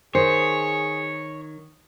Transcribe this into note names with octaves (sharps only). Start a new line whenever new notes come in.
D#3 G#4 C5 C#5